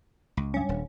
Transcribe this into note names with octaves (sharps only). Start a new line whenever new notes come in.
C#2
G2 C#4
D#1